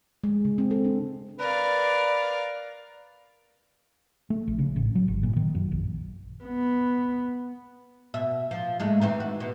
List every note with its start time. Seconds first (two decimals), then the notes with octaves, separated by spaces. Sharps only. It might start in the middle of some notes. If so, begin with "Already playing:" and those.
0.24 G#3
0.45 C#3
0.58 C4
0.71 A4
0.85 D4
1.39 A#4 B4 D5 F5
4.30 A3
4.47 A#1
4.59 C#3
4.76 A1
4.95 F#3
5.08 G1
5.23 A#2
5.36 D#3
5.55 F#2
5.72 A#1
6.44 B3
8.14 B2 E5
8.51 F3
8.80 G#2 G#3 A3
9.01 D#3 E3 C4
9.20 F#4
9.40 B2